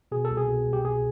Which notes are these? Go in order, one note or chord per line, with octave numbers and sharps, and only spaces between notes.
B2 G#4
A4
C2
G#4
B2
C2
G4
B2 G#4